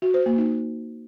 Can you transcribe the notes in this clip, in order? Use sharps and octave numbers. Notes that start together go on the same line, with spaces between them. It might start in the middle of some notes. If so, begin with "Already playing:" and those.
F#4
C5
A#3
D#4